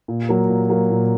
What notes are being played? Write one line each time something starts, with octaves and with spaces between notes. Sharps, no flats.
A#2
F#3 A#3
A#2
F#3 A#3
A#2